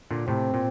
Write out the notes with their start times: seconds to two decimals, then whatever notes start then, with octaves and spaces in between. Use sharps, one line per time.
0.11 A#2 D3
0.28 A2 C3 C4
0.54 A#2